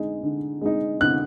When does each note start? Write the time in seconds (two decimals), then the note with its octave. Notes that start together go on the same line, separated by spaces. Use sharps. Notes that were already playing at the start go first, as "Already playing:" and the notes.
Already playing: D3 G#3 D#4
0.23 D3
0.61 G#3 D#4
1.00 D3 F#6